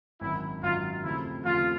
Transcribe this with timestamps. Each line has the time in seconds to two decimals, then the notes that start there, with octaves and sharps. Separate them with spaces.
0.21 G#1 F#2 D#3 F#3 E4
0.62 G#1 F#2 D#3 F#3 F4
1.04 D#2 C#3 F3 A3 C4 E4
1.45 D#2 C#3 F3 A3 C4 F4